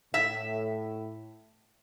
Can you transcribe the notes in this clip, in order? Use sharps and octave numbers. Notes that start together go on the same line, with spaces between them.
A2 E5